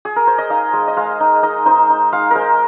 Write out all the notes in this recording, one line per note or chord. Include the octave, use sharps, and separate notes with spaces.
G#4
A#4
C5
D#5
D#4 F5
G#3
D#5
G#3 F5
D#4
D#4 D#5
D#4 C5
D#4
G#3 F5
G#3 A#4 C5